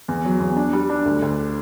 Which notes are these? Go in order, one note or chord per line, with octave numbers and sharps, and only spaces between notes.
E2
F#3
E2
D4
G3
D4
D2
D2